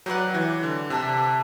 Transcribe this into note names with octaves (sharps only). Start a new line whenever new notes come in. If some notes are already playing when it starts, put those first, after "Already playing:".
F#3 G4 B4 D5 F#5
F#3
E3
D3
C3 D4 A4 E5